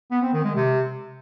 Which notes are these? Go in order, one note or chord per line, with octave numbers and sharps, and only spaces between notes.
B3
C4
D#3
G#3
C3